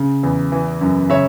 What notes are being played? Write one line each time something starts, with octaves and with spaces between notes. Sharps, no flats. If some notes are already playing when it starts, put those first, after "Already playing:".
Already playing: C#3
E2
E3
F#2
C#3 C#5 E5